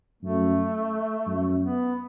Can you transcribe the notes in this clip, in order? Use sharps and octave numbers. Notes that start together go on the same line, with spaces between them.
F#2 A3
F#2
B3